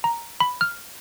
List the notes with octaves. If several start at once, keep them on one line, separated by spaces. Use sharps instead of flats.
A#5
B5
F6